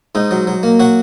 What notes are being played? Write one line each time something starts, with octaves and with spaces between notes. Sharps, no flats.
G#2 D#4
F#3
F#3
A#3
F#3 F#4